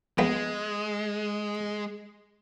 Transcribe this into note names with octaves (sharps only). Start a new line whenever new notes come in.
A#1 G#3 B3 G5